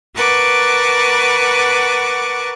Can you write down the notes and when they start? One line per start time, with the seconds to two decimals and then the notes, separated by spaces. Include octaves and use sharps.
0.16 A#4 B4 F#5 A5 C#6 D6